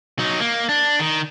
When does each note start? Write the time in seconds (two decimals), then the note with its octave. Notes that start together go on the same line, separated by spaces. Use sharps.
0.19 F#3 D#4
0.40 A#3
0.69 D4
0.99 D#3